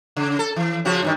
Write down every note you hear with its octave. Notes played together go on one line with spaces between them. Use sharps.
C#3
A4
E3
C#3 F3 F#4
G2 B2 D#3